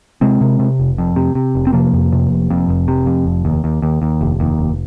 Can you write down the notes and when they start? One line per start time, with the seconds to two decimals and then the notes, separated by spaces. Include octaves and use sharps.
0.21 C3 G#3 C4
0.41 C3
0.60 C3
0.79 F1
0.98 F2
1.16 C3
1.35 C3
1.55 F1
1.67 C4
1.73 C3 F3 A#3
1.93 F2
2.12 C3
2.30 F1
2.50 F2
2.69 F1
2.88 C3
3.06 F2
3.26 F1
3.45 D#2
3.64 D#2
3.82 D#2
4.02 D#2
4.21 F1
4.40 D#2
4.59 F1